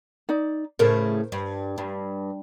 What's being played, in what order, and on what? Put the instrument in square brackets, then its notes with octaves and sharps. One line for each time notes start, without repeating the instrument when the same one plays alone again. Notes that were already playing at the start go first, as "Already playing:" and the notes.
[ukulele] D#4 D5
[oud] A2 C#3 A3 [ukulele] A#4 C5
[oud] G2
G2